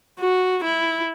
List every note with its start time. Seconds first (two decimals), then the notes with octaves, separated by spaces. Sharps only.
0.19 F#4
0.63 E4